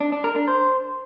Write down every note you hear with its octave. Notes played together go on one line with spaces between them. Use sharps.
D4
D4
A#4
D4
C5